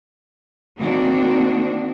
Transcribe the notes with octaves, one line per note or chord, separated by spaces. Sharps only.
D#3 A#3 C4 D4 F#4